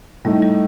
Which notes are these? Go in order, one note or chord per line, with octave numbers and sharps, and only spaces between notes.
A2 G3 A3 D#4
G3